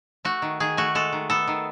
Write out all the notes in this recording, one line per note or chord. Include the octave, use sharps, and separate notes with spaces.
A3 F#4
D#3
D#3 G#4
A3 F#4
G#3 A4
D#3
B3 A4
D#3